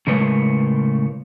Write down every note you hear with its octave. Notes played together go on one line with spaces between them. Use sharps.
A2 C#3 G#3 A#4 B4 C#5